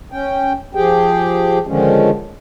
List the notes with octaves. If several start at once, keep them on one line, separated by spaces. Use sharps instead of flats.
C#4 G5
F3 G4 G#4 G5
D3 D#3 F3 G#3 C#4